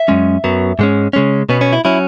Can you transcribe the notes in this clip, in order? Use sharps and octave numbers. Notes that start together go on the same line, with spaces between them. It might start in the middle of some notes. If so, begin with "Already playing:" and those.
Already playing: E5
F#2 C#3 G#3 C#4
F#2 F#3 B3
G#2 G#3 C#4
C#3 G#3 C#4
B2 B3 C#4
C#4
E4
F#3 C#4 E4